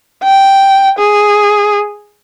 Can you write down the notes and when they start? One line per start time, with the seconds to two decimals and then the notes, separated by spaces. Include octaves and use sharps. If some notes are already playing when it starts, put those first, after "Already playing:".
0.24 G5
0.99 G#4